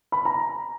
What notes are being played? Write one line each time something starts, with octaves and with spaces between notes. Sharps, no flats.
B5
A#5